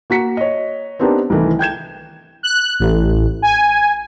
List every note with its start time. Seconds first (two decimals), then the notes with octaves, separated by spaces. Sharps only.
0.10 A#3 F#4 A#5 B6 C#7
0.37 C#5 D#5
0.99 B3 C4 D4 D#4 G4 A#4
1.30 C2 D#3 E3 A3
1.59 G5 G6 G#6 E7
2.43 F#6
2.80 A1
3.42 G#5